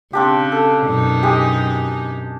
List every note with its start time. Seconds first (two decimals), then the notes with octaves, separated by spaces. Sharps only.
0.13 C#3 C4 D4 G4
0.52 A4
0.87 F#2 B2 D#4
1.23 G#3 G4